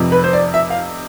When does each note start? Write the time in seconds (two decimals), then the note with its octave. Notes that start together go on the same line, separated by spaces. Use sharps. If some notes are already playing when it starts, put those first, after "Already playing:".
Already playing: F1 F2 C3
0.12 B4
0.24 C5
0.33 D5
0.54 E5
0.70 F5